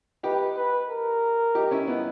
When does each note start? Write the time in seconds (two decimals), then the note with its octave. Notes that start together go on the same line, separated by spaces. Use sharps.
0.23 D#4 G4 B4
0.57 B4
0.89 A#4
1.55 D#4 G4
1.71 C#4 E4
1.88 B3 D#4